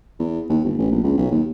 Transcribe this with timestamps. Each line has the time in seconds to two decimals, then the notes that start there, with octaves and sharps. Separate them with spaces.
0.19 E2
0.49 D#2
0.64 G1
0.78 A1
0.91 A#1
1.03 C#2
1.18 B1
1.31 D#2